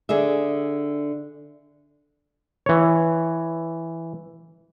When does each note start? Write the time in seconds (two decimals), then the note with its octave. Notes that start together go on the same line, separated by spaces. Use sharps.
0.09 D3 G#4 D5 E5
2.66 E3 C#5